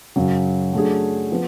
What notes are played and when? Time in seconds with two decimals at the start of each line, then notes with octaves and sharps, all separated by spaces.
0.16 F#2 C#3 F#3
0.73 F#3 A3 D4 G#4
1.32 F3 B3